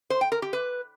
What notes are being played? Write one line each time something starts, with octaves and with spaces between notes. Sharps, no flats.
C5
G5
A#4
G4
B4